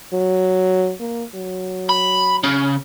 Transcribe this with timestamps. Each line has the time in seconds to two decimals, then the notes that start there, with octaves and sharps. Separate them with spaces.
0.13 F#3
1.00 A#3
1.35 F#3
1.89 B5
2.43 C#3